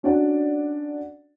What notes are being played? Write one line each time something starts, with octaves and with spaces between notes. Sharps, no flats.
C#4 D4 F#4 D5 F#5